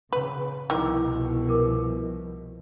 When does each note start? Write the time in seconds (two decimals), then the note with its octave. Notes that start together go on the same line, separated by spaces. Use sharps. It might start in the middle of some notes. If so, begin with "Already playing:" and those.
0.13 C#3 B4
0.70 C2 B2 D#3 F3 E4 D#5 G5 D6
1.48 G4 A#4 D6